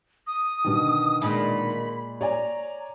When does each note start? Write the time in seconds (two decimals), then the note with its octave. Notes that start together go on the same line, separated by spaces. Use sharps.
0.27 D#6
0.64 B2 D3 D#3
1.22 A#2 G#3 B5
2.21 C#5 D5 G#5 A#5